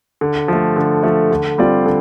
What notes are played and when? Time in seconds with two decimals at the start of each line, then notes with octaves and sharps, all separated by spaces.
0.21 D3
0.48 F3 A3
0.76 D3
1.03 F3 A3
1.31 D3
1.58 G3 C4 F4 D5
1.86 D3